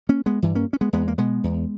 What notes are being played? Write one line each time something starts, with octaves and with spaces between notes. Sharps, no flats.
A#3 C#4
G#3 B3
G2 E3
A#3 C#4
C#4
G#3 B3
E2 G#3 B3
A#3
B2 G#3 B3
E2